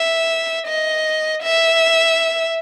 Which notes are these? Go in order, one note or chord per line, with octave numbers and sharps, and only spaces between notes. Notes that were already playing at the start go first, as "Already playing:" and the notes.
Already playing: E5
D#5
E5